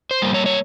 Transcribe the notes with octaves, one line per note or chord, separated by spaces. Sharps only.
C5
G3 A#3
C#5
C#5